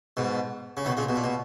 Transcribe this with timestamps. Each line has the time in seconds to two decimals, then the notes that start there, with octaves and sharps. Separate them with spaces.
0.17 G#2 B2
0.77 C#3
0.85 B2 D#3
0.97 A#2 C#3
1.09 B2
1.16 A#2
1.24 B2